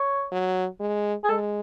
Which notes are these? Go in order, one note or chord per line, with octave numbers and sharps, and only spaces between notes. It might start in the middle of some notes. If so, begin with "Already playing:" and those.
Already playing: C#5
F#3
G#3
G#4
G#3 A4